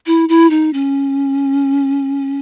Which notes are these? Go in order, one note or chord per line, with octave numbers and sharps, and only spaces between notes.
E4
E4
D#4
C#4